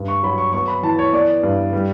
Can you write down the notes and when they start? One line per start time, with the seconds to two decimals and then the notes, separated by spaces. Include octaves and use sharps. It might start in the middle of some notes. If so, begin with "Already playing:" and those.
Already playing: G2
0.08 C#6
0.23 F#3 B5
0.38 C#6
0.53 B3 C#6
0.68 B5
0.83 E3 A5
0.99 C#5
1.13 B3 D5
1.43 G2
1.73 G3